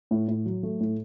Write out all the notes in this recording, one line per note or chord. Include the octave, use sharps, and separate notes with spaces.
A2
A2
F#3
A3
A2